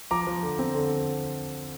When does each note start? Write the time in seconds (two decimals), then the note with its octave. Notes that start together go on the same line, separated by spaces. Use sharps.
0.11 F3 A#5 D6
0.27 F3
0.43 D3
0.59 C4
0.75 D3